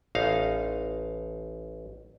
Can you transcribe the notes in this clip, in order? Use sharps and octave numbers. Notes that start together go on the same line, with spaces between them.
A1 D#4 F5